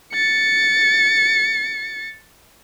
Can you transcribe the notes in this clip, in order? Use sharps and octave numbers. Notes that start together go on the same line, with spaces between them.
A6 C#7